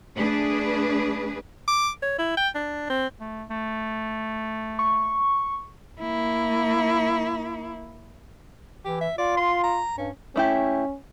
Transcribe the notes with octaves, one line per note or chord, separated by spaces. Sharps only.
A3 D4 G#4 B4
D6
C#5
E4
G5
D4
C4
A3
A3
C#6
A#3 E4
E3 G4
E5
F4 D5
C6
A#5
G2 C#4
A3 C#4 E4 G4